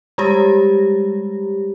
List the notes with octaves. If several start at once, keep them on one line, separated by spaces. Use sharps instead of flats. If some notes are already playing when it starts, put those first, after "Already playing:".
G3 G#3 G4